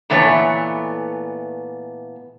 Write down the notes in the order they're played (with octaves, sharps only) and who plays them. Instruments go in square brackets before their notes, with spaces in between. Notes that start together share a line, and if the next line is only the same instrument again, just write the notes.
[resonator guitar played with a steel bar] A#2 E3 A3 B3 C#5